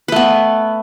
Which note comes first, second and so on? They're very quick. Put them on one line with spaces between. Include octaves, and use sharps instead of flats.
B4 A3 B3